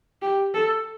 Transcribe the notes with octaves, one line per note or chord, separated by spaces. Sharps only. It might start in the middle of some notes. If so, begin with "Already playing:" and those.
G4
A4